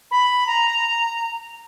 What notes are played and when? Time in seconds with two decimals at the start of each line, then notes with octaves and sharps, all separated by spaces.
0.11 B5
0.47 A#5